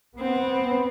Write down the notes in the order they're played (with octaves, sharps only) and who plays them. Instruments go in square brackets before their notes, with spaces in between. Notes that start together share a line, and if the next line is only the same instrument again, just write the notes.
[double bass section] B3 [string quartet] C4